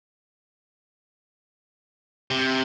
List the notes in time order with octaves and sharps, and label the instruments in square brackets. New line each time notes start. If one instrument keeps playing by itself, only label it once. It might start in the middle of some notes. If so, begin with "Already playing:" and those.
[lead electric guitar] C3